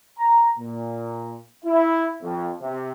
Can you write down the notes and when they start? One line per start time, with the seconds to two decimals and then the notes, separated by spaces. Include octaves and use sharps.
0.18 A#5
0.58 A#2
1.65 E4
2.22 F2
2.61 C3